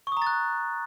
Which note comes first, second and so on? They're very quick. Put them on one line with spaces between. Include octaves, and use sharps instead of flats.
C#6 D#6 A#5 A6 F#6